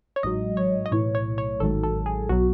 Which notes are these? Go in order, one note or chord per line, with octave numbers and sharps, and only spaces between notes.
C#5
A1 G#2 F#3 D#5
C#5
D#5
B1 A2 E3 C#5
C#5
C#5
A1 G#2 D#3 F#3 A4
A4
G#4
B1 B2 F#3 F#4